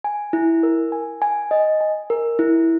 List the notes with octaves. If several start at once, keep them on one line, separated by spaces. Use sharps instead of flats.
G#5
E4
A#4
G#5
G#5
D#5
G#5
A#4
E4